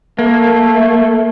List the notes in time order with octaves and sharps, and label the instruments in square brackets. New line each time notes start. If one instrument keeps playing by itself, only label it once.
[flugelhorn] A3 [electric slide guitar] A#3